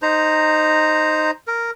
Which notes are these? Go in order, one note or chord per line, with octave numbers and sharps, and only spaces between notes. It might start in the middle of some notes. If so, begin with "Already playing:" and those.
D#4 C5 A#5
A#4